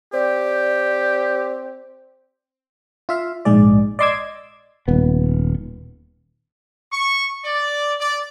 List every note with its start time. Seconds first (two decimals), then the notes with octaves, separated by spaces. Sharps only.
0.13 C4 G4 D5
3.09 F4 E5 F5
3.45 A#1 G#2 G#3 G#4 D5
3.99 D5 D#5 C6 D6 E6 G#6
4.88 D#1 B3
6.93 C#6
7.45 D5
8.00 D5